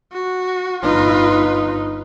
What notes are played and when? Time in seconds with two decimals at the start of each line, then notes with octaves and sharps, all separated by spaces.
0.13 F#4
0.83 G1 D#4 F4 B4